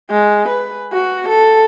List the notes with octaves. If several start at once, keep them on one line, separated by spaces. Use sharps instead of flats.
G#3
B4
F#4
A4